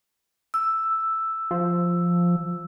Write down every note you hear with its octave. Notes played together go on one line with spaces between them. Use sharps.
E6
F3